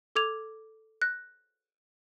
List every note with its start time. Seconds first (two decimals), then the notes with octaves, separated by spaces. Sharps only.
0.16 A4 D6 G#6 F7
1.02 F#6 A#6